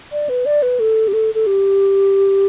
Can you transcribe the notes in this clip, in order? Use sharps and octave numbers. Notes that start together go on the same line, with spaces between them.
D5
B4
D5
B4
A4
G4
A4
A4
G4